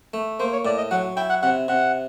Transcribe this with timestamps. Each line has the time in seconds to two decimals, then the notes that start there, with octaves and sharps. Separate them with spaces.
0.14 A3
0.40 A#3 C5
0.52 C#5
0.65 A2 D5
0.78 D#5
0.91 F#3 F#5
1.16 E4 G5
1.30 F#5
1.42 C3 F#5
1.68 C3 F#5